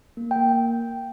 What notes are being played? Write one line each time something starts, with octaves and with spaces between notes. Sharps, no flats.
A#3
G5
A#3